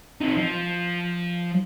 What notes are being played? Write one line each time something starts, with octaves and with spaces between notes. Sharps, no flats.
C4 D#4
F3